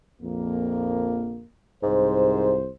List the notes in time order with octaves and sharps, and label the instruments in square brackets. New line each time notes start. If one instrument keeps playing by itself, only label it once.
[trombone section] A#1 F2 A#3
[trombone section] C2 C5 [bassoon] G#2